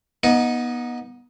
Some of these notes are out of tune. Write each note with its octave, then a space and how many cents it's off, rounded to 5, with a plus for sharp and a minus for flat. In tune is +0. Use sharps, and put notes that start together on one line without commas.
B3 -25 D#4 +10